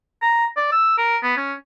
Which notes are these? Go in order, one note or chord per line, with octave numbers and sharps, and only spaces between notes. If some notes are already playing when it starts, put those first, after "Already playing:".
A#5
D5
E6
A#4
B3
C#4